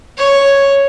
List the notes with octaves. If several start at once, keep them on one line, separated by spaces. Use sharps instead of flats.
C#5